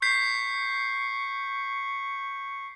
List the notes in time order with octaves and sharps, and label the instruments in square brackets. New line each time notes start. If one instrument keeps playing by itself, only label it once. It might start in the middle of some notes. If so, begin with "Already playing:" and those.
[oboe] C#6 [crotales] G6 B6 C7